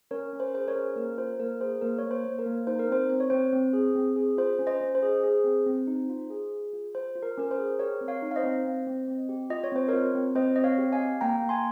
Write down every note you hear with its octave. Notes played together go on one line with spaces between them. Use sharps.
C#4 A#4 C#5
C#4
C5
A#4
G#4 C5
A#4 C#5
C#4
A#3 A#4
F4 C5
A#3 A#4
G#4 C5
A#3 A#4
A#3 C#5
C5
A#3
A#4
A#3
D#4 C5
A#4
C4 C5
C4 C5
C#5
C4 C5
C4
G#4
C4
G#4
F4 C5
C#4
C5 D#5
C#4
C5
G#4
G#4
C4
C4
D#4
F4
G#4
G#4
F4
F4 C5
F4
A#4
C#4 A#4
C5
G#4
G4 A#4 C#5
C4
C#5 F5
D#4
F5
C5 D#5
C4
C4
C4
C4
G4
F4 D#5
C#5
C4 C5
F4 A#4 C#5
C4
C4 C5 D#5
C4 D#5
C#5 F5
G4
F5 G#5
G4
A#3 G5 A#5
A#3
G#5 C6